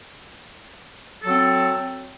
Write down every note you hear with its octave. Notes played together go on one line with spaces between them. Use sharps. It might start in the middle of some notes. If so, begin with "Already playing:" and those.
F#3 C4 A4